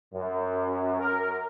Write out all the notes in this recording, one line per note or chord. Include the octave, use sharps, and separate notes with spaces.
F#2
A#4